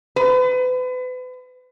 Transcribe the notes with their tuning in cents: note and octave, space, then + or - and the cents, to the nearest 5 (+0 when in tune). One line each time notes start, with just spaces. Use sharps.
B4 +35